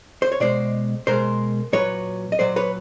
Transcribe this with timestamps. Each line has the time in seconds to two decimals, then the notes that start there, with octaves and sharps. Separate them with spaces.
0.22 C5
0.32 C#5
0.40 B2 G#3 C5 D5
1.07 B2 G#3 A#4 C5
1.73 A#2 F#3 B4 C#5
2.32 D#5
2.39 A#2 F#3 C5 D5
2.56 B4 C#5